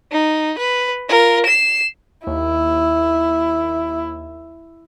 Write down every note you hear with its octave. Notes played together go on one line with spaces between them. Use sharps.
D#4
B4
F4 A#4
C7 E7
D#2 E4